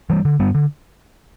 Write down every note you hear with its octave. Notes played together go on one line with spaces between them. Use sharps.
G2 E3 G3
D3
G2 G3 B3
D3